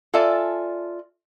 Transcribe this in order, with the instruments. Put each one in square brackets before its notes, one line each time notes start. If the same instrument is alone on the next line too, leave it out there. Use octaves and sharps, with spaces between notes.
[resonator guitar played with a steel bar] F4 A4 D5 E5 G#5